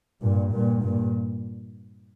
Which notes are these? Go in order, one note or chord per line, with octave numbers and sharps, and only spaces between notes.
G2 A#2
G2 A#2
G2 A#2